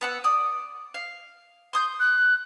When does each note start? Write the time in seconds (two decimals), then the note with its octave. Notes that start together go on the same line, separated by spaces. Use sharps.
0.01 B3 F#5 E6
0.24 D5 D#6
0.94 F5
1.73 C6 D#6 G6
2.00 F#6